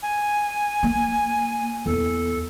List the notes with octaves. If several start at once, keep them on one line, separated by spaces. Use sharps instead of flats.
G#5
A#3
E2 A4